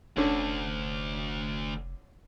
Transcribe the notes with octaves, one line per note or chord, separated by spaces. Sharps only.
F1 D2 D3 C#4